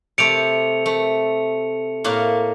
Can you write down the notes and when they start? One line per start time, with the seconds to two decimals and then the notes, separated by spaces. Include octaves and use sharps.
0.18 C3 A3 C#7 D7 F7
0.86 A3
2.04 A2 A#3 F5